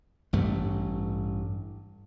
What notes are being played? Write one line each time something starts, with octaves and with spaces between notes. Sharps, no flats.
A1 G2 A3